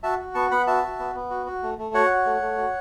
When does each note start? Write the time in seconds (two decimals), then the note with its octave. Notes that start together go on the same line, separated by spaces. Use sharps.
0.03 F#4 E5 A5
0.19 F#4
0.35 B3 A5 C#6
0.51 B3 F#5 B5
0.67 F#4 E5 A5
0.83 F#4
0.99 B3
1.15 B3
1.30 F#4
1.46 F#4
1.63 A3
1.78 A3
1.94 F#4 C#5 F#5
2.10 F#4
2.26 A3
2.41 A3
2.58 F#4